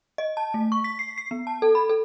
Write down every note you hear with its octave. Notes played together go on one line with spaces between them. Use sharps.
D#5
A5
A3
C#6
B6
C7
C7
B3
A5
A4
B5
A4